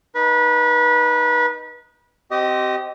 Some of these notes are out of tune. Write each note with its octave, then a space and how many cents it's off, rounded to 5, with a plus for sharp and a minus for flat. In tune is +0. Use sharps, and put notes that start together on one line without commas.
D#4 -5 B4 -25
C4 +0 G4 -30 D#5 +0